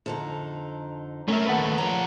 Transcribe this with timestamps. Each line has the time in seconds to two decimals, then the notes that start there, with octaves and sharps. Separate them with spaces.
0.06 F2 D3 D#4
1.28 A3 C#4 A#4 E5
1.46 D#2 A3 B4 F#5
1.78 F#2 F3 D5 A#5